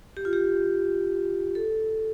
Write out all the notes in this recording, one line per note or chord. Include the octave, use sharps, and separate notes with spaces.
G4
F4
G4
A4